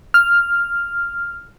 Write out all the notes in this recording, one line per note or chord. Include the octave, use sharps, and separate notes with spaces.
F6